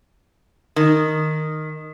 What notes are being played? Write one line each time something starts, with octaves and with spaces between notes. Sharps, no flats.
D#3